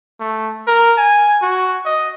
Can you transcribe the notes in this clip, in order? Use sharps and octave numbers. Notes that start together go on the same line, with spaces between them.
A3
A#4
G#5
F#4
D#5